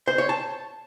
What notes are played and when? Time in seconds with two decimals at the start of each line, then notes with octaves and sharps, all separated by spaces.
0.08 C5
0.18 C#5
0.29 A5